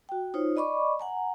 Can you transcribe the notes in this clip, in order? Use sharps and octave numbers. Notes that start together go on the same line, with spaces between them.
F#4 G5
D#4 F4 C5 C#5
D5 D#5 B5 C#6 D6
F#5 G#5 A#5